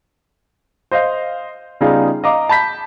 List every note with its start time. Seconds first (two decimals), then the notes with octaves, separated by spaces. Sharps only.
0.91 C5 D#5 F5 G6
1.81 C#3 G3 B3 D#4 F4 G#4
2.24 D#5 F5 A#5 D6
2.49 A5 B5 G6 B6